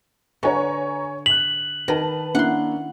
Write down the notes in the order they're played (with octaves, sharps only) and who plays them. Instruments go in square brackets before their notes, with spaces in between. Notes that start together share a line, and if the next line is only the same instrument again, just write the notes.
[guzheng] D3 [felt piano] B4 A#5 [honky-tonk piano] C#5 G#5 C#6
[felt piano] F#6 B6 [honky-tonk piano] F7 [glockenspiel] F#7
[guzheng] D#3 [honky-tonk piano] B4 A5
[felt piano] A#3 D4 E4 [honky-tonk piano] C#4 [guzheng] F#5 C6